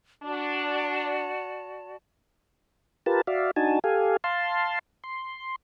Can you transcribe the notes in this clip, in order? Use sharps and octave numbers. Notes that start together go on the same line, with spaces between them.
D4 F#4 D5 A5
F4 G4 A#4 B4 A5
F#4 D5 E5 F5
D4 D#4 F#4 G#5 A5
G4 A4 F5 G#5
F5 A5 C6
C6